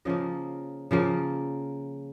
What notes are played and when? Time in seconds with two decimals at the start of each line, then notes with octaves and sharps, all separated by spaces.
0.05 C#3 F3 A#3 D#5
0.91 C#3 F3 A#3